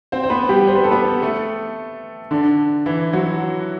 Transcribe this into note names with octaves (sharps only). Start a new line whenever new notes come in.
C4 C5
C5
B3 B4
G3 G4
C5
B4
A4
B3 B4
A3 A4
D3 D4
E3 E4
F#3 F#4